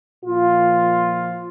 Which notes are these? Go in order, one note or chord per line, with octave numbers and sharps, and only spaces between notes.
A#2 F3 F4